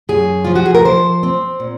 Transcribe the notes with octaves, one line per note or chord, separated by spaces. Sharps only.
F#2 G#4
F3 F4
F#4
G#4
A#4
F3 C5
C4
A#2